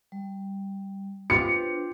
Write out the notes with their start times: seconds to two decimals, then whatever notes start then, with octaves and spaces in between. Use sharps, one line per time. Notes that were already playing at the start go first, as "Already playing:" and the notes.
0.12 G3
1.30 D4 F4 G4 B4 C5 C#7